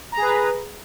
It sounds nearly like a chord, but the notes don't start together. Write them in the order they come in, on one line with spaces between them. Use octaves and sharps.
A#5 G#4 B4